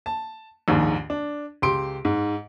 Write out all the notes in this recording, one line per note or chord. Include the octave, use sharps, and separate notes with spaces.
A5
A#1 D#2 G#2
D4
C#2 G4 C6 D7
G#2